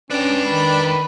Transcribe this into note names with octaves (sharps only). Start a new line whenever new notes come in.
C#4 D4 B4 G5
D#3 B5